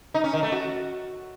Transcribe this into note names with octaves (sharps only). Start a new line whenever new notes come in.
D#4
C#4
D#3
A3
F#4